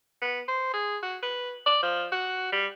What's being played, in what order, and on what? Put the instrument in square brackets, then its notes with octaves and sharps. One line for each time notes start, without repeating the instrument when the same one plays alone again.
[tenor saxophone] B3
C5
G#4
F#4
B4
D5
F3
F#4
G3